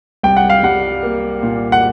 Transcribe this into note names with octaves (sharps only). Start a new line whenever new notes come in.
C2 G5
F#5
F5
G3 F#5
A#3
A#2
F#5